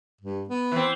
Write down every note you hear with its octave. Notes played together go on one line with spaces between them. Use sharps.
G2
B3
E3 C4